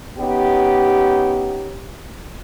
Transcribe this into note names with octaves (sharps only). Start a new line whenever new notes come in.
B3 C#4 D#4 G4